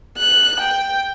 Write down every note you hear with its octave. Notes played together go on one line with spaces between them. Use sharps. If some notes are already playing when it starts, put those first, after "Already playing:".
F#6
G5